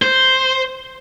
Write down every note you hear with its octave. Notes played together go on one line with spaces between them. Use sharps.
C5